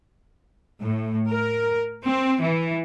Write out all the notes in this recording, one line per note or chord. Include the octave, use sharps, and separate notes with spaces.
A2
A#4
C4
E3